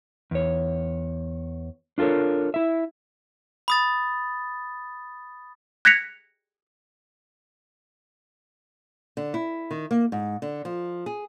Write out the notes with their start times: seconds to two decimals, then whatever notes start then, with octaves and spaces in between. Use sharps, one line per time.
0.31 E2 C#5
1.98 D4 F4 A4 A#4 C#5
2.54 E4 E5
3.68 B5 D#6 A6
5.85 F#6 G#6 A#6 B6 C#7 F7
9.17 D3
9.34 E4
9.71 D#3
9.91 A#3
10.12 G#2
10.42 D3
10.65 F3
11.06 G#4